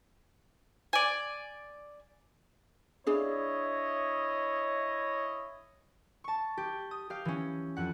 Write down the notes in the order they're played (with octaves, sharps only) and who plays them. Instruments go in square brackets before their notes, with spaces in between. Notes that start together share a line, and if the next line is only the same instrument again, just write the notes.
[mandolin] D5 G#5
[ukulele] D4 G#4 F5 [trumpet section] E4 C#5 D#5
[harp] A5 C#6
G4
D#6
G4 F5
E3 C#4
F2 F#5